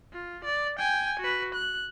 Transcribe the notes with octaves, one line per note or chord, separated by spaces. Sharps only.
F4
D5
G5 G#5
F#4 B4
F#6